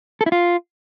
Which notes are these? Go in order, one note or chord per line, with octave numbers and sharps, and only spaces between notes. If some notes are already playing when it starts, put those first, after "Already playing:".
A4
E4
F4